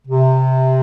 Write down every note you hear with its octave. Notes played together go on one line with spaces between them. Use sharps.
C3